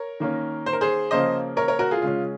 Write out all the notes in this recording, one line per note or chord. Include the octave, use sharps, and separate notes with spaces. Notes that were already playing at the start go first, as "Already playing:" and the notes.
Already playing: A#4 C#5
D#3 A#3 C#4
C5
A#4
G#4 C5
C#3 F3 A#3 C#4 C5 D#5
A#4 C#5
A#4 C#5
F#4 A#4
F4 G#4
C#3 G#3 C#4 F4